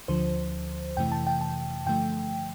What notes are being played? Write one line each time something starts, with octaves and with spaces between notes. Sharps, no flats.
D2 D3 F3 C5
F2 C3 E3 A3 G5
A5
G5
A5
G2 D3 F3 A3 G5